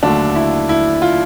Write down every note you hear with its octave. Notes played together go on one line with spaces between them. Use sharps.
D#2 D3 F#3 A3 D4
E4
E4
F4